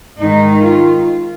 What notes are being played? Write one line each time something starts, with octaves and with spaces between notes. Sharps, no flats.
G#2 D#3 D#4
F4